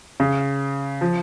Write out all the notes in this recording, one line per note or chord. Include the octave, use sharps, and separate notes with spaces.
C#3
F3